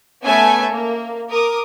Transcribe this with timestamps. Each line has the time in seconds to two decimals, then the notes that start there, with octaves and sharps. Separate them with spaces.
0.23 A3 B3 C#4 A4 E5 G#5
0.72 A#3
1.30 A#4 D6 D#6